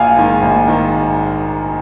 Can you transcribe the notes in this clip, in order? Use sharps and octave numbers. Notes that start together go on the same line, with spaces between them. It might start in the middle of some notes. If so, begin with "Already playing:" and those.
Already playing: A#1 F5 G#5
G#2 D#3
A#1
G#2 D#3